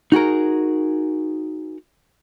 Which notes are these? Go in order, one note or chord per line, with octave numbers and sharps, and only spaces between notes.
D#4 F#4 G#4 A#4